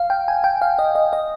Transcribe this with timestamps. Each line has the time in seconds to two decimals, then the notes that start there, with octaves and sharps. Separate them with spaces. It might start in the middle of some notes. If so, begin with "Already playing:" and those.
Already playing: F5
0.10 G5
0.28 G#5
0.44 G5
0.62 F5
0.79 D#5
0.95 D#5
1.13 D#5